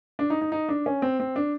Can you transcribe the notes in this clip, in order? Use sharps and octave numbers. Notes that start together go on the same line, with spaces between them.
D4
D#4
D#4
D#4
D4
C#4
C4
C4
D4